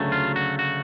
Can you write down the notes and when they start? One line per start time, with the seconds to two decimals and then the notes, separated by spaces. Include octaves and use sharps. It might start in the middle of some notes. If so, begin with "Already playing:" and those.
Already playing: D2 C#3 F#3 A3
0.12 F4
0.36 F#4
0.59 F#4